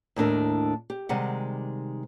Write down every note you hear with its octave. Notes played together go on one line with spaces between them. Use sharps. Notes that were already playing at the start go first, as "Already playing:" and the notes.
D#2 A2 D4 A#4
G4
C3 D#3 G3 G#3 F#5